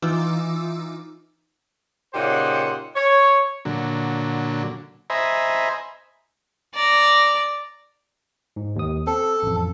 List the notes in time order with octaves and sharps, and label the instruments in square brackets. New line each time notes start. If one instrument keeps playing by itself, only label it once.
[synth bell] E3 D#4 F4 D6 E6
[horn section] A#2 C#3 D#4 G4 C5 F#5
C#5
[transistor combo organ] A#2 D3 F#3
C5 D#5 E5 G#5 A#5 B5
[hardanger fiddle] D5 A#5
[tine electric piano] G#2
D#2 D#6
[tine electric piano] C4 [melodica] A4
[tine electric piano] A1 F2